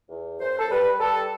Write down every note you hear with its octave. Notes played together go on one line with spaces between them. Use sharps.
E2
F#2 C5
A4
G3 B4
G3 A4